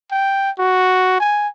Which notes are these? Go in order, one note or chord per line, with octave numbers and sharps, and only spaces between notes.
G5
F#4
G#5